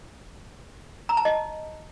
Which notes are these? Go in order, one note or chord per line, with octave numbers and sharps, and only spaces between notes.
A#5
A5
D#5